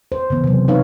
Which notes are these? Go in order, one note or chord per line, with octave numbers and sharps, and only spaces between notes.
C5
C#3 E3 B3
C3 E3 F#3
D#4 B4 C#5 F5